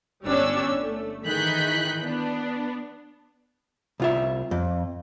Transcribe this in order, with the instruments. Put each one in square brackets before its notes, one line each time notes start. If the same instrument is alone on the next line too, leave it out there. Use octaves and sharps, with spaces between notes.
[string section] G1 G3 C#4 D4 C#5 E6
A3
D#3 E3 G#4 F#6 G6 B6
B3 D4
[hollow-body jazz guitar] C2 F4 E5
F2